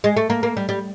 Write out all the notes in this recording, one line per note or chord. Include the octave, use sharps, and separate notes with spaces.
G#3
A3
A#3
A#3
G3
G3